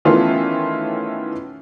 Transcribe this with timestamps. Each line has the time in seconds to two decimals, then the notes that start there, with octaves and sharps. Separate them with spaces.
0.05 D#3 E3 A3 B3 C#4 F4